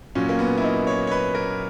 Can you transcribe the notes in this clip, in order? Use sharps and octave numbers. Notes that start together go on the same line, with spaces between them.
A#2 F#3 C#4
A#3
B3
E4
D#4
C#5
C#5
B4
A#4